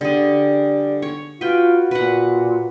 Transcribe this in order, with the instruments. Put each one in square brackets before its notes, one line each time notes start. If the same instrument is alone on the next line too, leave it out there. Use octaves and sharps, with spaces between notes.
[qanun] D3 G#4 [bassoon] G3
[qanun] C#5
[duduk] F4 [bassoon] F#4 [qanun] B4 G5
[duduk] A#2 [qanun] B4 F#5